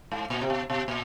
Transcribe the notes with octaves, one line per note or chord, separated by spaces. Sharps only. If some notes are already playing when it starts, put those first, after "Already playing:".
G#2
A#2
C3
B2
B2
A#2